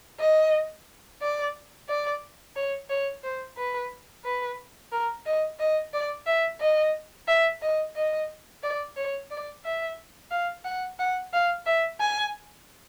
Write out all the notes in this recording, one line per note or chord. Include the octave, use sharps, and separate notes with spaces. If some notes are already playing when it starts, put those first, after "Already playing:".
D#5
D5
D5
C#5
C#5
C5
B4
B4
A#4
D#5
D#5
D5
E5
D#5
E5
D#5
D#5
D5
C#5
D5
E5
F5
F#5
F#5
F5
E5
G#5